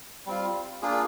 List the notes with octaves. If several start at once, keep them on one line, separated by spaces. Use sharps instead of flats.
G3 C4 F4
A#3 D4 F4 G#4